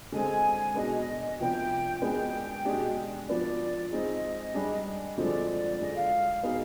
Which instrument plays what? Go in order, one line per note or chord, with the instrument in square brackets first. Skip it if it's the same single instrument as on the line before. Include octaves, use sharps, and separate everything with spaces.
[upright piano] D3 G#3 C4 [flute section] G#5
[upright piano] B2 B3 D4 G#4 [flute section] D#5
[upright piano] C3 F3 B3 D4 [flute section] G5
[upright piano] G#3 B3 D4 G#4 [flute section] G5
[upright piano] B2 G#3 D4 G4
[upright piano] F3 B3 D4 [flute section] D5
[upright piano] G#3 C4 D#4 G#4 [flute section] D#5
[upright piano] G3 D4 G#4
[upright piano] D3 F3 G#3 C4 [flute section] D5
[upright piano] D3 G#3 D4 [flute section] D#5
[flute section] F5
[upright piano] B2 B3 D#4 G#4